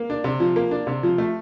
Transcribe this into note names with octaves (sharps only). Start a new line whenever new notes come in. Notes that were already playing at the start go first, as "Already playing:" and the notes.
Already playing: A#3
D4
C3
F3
A#3
D4
C3
F3
A3